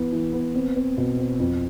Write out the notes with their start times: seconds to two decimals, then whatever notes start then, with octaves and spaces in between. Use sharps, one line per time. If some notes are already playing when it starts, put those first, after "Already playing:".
Already playing: E3 B3
0.12 E3
0.33 B3
0.55 C4
0.76 C4
0.98 B2
1.19 C4
1.40 F2